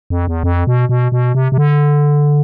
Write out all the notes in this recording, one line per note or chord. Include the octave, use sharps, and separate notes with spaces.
F2
E2
F2
B2
B2
B2
C3
C3
D3